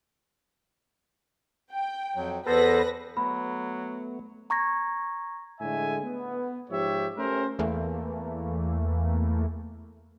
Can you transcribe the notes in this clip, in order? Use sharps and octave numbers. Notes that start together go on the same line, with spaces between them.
G5
F2 F#3
E2 B3 A4 B4 C5 A#6
F#3 A3 B3 B5
A#5 C#6 G#6 A#6
A2 D3 G#3 E5 G#5
B3
G#2 F3 G4 C#5 E5
A3 C#4 G4 A#4 C5
E2 E3 A3 A#3